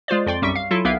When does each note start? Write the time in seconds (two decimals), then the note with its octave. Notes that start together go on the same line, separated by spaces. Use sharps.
0.08 G#3 F4 C5 D5
0.26 F2 D5 G5 C6
0.42 B1 F#2 G3 E5 C#6
0.55 F5
0.71 F#3 E4 F4 A4
0.84 B1 A#3 B3 E5 F5